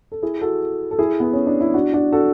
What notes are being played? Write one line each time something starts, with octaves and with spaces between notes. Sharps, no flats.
A4
E4 G#4
F#4 A4
A4
E4 G#4
B3
C#4
D4
E4
D4 F#4
D4 F#4
F#4 A4